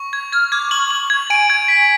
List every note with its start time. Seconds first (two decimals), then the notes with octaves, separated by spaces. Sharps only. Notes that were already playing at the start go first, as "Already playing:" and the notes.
Already playing: C#6
0.13 G#6
0.32 F6 G#6
0.52 D6 G#6
0.71 C#6 F#7
0.90 F#7
1.10 G#6
1.30 G#5 D7
1.50 G#6
1.68 B6